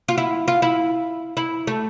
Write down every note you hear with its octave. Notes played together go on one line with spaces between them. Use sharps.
F4
E4
F4
E4
E4
A3